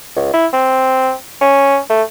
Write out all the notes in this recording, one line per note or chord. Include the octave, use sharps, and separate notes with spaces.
C#2
E4
C4
C#4
A3